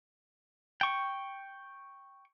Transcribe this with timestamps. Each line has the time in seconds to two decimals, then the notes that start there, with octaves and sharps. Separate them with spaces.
0.81 G5 C#6